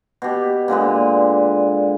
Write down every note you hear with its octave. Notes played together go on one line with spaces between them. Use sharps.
B2 G4
A#2 D3 G#3 B4